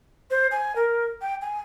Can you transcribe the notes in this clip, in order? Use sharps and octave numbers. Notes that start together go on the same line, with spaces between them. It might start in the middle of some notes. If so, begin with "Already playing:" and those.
C5
G#5
A#4
G5
G#5